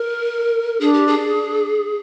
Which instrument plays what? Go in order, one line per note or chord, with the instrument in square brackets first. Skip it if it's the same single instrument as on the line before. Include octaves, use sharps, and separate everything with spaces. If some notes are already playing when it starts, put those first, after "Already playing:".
Already playing: [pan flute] A#4
[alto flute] D4 [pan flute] G#4
[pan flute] G4
G#4